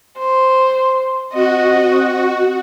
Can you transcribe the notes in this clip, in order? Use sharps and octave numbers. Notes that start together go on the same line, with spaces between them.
C5
C4 F#4 D#5